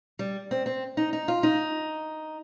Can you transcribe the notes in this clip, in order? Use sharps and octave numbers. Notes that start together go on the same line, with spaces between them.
G3
C4
C4
D#4
D#4
F4
D#4